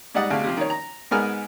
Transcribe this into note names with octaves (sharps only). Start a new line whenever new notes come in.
G#2 G3 D5 D#5 F#5
D2 C3 G#3 F5
C3 F3
D#3 C#5
A#5
G#2 G#3 B3 A#4 G#5 F6